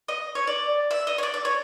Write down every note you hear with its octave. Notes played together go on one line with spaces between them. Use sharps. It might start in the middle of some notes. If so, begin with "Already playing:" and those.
D#5
C#5
D5
E5
D#5
C#5
D5
D5
C#5